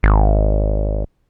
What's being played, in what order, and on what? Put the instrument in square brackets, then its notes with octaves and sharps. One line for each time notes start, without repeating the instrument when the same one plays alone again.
[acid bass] G#1